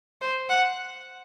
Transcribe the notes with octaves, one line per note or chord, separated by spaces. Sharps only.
C5
F#5